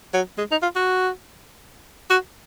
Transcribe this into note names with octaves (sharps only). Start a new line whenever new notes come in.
F#3
G#3
D#4
F4
F#4
F#4